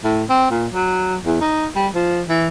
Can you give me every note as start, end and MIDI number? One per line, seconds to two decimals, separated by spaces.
0.04 0.23 45
0.29 0.48 60
0.50 0.67 46
0.74 1.16 54
1.25 1.38 40
1.41 1.68 63
1.76 1.87 55
1.95 2.21 53
2.29 2.48 52